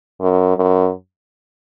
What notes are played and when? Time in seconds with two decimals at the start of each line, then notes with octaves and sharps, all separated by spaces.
0.21 F#2
0.57 F#2